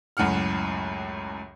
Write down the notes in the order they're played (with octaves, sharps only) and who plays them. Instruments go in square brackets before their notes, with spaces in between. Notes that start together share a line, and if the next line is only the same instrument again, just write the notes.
[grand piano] C#2 F#2 A2 F#5 F6